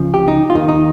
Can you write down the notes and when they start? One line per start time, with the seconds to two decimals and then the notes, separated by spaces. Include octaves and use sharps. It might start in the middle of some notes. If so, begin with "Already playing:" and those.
Already playing: C#2 C#3 F3
0.14 G4
0.28 D#4
0.50 F4
0.55 D#2 D#3 D#4
0.68 D#4